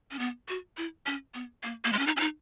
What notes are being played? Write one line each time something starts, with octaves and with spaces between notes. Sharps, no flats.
C#4
B3
F#4
E4
C#4
B3
A#3
A#3
G#3
C#4
D#4
C#4
D#4